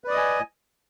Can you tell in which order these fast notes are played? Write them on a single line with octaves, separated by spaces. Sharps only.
B4 D5 D#6 D#5 G#5